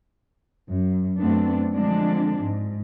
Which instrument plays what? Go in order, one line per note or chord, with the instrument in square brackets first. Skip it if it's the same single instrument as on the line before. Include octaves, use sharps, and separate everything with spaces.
[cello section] F#2
F#2 A3 B3 C4 D4
D3 F3 G#3 C4 D4
G#2